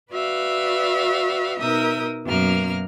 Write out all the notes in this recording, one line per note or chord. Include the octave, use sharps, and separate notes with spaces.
F#4 B4 D5 E5 F5
B2 D#4 A#4 E5 D#6 G6
F#2 B2 A#3 F6